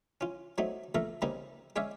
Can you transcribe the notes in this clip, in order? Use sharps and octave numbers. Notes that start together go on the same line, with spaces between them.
C#4 F4
F#3 A3 C4 D#4
A#2 A3 A4 F5 A#5
C#3 G3 A#3 C4 D#4
G#3 C#4 C#5 D5 E5 F5